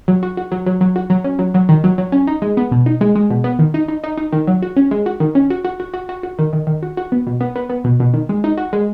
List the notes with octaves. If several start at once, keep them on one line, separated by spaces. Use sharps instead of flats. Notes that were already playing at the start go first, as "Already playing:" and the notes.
F#3
F#4
F#4
F#3
F#3
F#3
F#4
F#3
C#4
F#3
F#3
D#3
F#3
F#3
C#4
D#4
G#3
B3
B2
D#4
G#3
G#3
B2
B3
D#3
D#4
D#4
D#4
D#4
D#3
F#3
F#4
C#4
G#3
F#4
D#3
C#4
F#4
F#4
F#4
F#4
F#4
F#4
D#3
D#3
D#3
F#4
F#4
B3
B2
B3
B3
B3
B2
B2
D#3
G#3
D#4
F#4
G#3